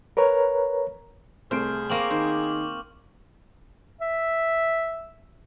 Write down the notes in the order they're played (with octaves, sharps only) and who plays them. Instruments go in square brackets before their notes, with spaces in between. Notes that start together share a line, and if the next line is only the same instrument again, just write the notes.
[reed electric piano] A#4 B4 C#5 A#5
[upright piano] C2 A3 D7 [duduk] G#4 [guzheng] C5 [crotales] F6
[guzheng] A#3 C4 [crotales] C#6 D6 F#7
[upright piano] D#3 [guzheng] C5
[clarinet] E5